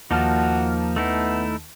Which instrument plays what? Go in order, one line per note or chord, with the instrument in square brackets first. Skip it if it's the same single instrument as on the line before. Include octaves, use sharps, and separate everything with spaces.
[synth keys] D#2 A5 F6 [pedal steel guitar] F3 A#3 D#4 [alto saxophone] F#4
[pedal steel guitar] A3 D#4 E4 [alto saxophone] B3